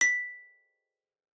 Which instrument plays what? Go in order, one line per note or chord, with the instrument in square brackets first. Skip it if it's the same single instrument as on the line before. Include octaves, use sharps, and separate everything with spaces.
[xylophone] B6